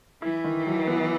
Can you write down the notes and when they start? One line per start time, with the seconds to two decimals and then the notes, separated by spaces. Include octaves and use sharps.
0.22 E3 E4
0.44 D#3
0.66 F#3
0.87 B3